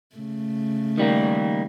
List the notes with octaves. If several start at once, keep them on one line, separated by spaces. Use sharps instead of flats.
C#3 A3
D#3 G3 A#3